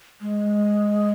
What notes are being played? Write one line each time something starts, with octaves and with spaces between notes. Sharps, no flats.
G#3